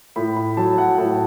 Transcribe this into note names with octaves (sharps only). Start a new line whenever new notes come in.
A2 B5
B5
F#3 A5
F#5
A2 A5